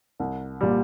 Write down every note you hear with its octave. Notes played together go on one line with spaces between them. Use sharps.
C2
A#2 G3